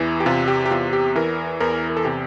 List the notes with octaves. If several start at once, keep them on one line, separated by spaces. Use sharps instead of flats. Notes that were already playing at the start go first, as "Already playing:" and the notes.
Already playing: E2 E3
G4
C3 F4
G4
G4
E2 F4
G4
E3 A#4
E2 A#4
A#4
A4
C3 G4